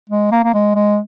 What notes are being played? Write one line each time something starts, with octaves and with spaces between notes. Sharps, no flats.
G#3
A#3
A#3
G#3
G#3